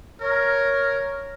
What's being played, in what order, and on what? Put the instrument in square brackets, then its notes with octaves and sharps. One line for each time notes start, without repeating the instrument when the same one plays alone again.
[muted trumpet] A#4 [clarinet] C#5